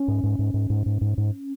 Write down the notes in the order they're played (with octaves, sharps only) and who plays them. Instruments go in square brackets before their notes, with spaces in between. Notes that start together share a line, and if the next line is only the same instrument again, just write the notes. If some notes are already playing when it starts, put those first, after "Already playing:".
Already playing: [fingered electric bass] C#4
G#2
G#2
G#2
G#2
G#2
G#2
G#2
G#2